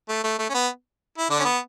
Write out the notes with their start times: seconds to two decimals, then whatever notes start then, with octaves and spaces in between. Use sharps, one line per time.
0.09 A3
0.24 A3
0.39 A3
0.50 C#4
0.54 B3
1.18 E4
1.30 D3 D4
1.39 C#4
1.45 B3